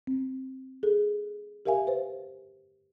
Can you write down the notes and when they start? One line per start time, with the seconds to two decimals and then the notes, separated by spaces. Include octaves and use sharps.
0.07 C4
0.83 G#4 A4
1.66 G4 A#4 E5 F5 G#5
1.87 B4 C5